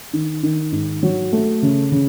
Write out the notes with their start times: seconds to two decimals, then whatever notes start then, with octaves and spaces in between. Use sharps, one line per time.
0.13 D#3
0.43 D#3
0.72 G#2
1.03 F#3
1.32 A3
1.62 C#3
1.92 C#3